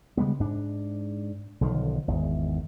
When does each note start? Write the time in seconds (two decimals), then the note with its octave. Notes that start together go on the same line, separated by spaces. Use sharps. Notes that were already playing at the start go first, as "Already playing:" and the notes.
0.17 C#3 G3 G#3 B3
0.39 G#2 D4
1.61 B1 D3 D#3 F3
2.08 G#1 E2